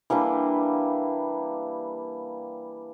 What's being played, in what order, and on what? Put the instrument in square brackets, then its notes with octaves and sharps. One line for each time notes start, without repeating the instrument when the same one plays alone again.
[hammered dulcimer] E3 G3 A#3 D4